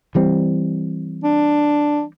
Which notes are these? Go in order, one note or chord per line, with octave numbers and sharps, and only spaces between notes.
E3 G3 C4
D4